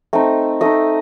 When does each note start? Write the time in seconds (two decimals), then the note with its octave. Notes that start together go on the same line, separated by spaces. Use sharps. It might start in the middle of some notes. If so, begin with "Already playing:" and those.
0.13 A3 C4 D#4
0.61 A3 C4 D#4 D#5